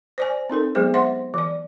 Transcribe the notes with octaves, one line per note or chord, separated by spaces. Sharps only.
C5 D5 G#5
C4 D#4 A4 A#4
F#3 G#3 B3 G#4 C5
C5 E5 F#5 C6
E3 D5